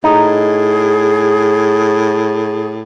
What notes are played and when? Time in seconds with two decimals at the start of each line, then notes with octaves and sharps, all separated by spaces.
0.04 A2 D#4 G#4